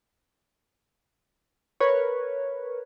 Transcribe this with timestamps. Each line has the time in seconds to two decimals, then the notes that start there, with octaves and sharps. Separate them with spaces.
1.80 A#4 B4 C#5